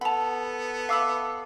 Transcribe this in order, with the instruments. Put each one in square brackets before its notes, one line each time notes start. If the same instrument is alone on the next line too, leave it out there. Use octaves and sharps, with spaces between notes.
[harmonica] B3 A4 [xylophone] F#5 F7 [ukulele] A5 B5
[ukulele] E5 B5 [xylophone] F5 D6 E6